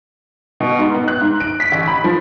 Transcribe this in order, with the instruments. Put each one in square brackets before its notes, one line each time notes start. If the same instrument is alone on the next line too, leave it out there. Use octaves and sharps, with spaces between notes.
[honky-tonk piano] B2
G#2
B3
F#6
G#2
D7
B6
A1
B5
F3